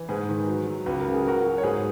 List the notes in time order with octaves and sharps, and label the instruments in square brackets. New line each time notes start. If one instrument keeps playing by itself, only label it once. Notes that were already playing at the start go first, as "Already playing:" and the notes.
Already playing: [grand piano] E3
G#2 G#4 B4
D#3
F#3
F#3
C#2 B4
A#4
C#3
G#4
F#3 F#4 A#4
F#3
C#5
G#2 G#4 B4